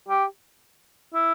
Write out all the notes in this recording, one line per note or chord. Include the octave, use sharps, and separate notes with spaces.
G4
E4